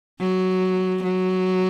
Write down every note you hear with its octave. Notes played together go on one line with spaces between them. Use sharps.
F#3
F#3